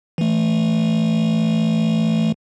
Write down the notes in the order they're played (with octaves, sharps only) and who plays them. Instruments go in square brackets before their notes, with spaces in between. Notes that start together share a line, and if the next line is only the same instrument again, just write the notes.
[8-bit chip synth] E3 A3